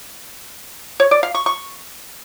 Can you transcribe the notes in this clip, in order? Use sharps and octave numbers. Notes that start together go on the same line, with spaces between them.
C#5
D5
F5
C#6
C#6